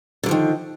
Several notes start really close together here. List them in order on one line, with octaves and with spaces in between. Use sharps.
D3 F#3 F3 D#3